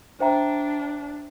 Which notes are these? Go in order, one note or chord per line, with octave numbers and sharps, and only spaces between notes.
D4 C5 E5 G5 A#5